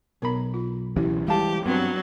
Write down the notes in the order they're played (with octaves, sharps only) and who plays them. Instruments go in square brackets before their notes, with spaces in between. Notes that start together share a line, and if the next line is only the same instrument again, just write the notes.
[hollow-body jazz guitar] B1 B5 [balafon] B3 A#4 A#5
[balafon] F4
[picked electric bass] C#2 E3 C#4 [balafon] E4 G4
[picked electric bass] E3 G3 G#3 [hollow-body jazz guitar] E4 A5 [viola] G4 [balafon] F5
[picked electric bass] G2 [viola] F#3 [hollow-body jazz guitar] B3 C4 B4